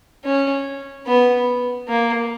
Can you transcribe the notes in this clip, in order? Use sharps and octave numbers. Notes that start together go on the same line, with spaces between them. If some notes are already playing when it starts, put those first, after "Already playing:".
C#4
B3
A#3